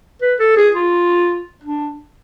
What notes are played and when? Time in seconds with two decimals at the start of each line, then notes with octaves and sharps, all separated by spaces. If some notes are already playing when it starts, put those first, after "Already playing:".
0.22 B4
0.40 A4
0.57 G#4
0.75 F4
1.63 D4